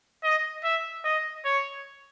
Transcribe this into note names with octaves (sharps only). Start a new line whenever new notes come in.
D#5
E5
D#5
C#5